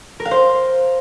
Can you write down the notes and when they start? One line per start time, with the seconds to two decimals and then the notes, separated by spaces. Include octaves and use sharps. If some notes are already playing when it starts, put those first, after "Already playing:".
0.20 A#4
0.25 F5
0.31 C5